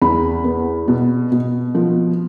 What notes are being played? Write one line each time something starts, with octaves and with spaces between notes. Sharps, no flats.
E2 B5
B3
B2
B2
F3